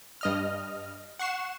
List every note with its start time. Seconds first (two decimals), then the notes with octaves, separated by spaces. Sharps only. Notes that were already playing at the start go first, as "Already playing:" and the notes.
0.21 G2 D#5 F6
1.19 F#5 C#6 C7 E7